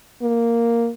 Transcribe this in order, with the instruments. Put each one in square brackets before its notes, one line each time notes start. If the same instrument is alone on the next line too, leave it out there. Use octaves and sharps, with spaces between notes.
[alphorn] A#3